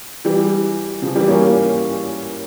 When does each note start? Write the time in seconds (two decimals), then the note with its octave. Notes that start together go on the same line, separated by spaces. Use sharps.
0.25 E3 G3
1.02 C#3 F3
1.15 E3 G3
1.28 A#3 C#4